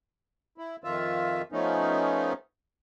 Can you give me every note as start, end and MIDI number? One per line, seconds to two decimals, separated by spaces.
0.58 0.76 64
0.84 1.42 41
0.84 1.42 51
0.84 1.42 65
0.84 1.42 76
1.52 2.33 53
1.52 2.33 57
1.52 2.33 59
1.52 2.33 61
1.52 2.33 63